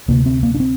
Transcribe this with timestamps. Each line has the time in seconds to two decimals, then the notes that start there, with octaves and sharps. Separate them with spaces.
0.08 D2 C3 A#3
0.26 C4
0.43 A#3
0.54 D4
0.60 C4